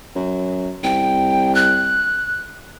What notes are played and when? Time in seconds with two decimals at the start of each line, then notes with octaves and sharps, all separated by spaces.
0.15 F#2
0.84 C2 G5
1.55 F#6